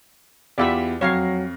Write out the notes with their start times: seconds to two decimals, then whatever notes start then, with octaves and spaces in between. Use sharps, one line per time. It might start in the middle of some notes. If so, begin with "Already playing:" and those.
0.58 E2 F4 G4 D5 E5 B5
1.01 F2 F#3 C#5 F5 A#6 C7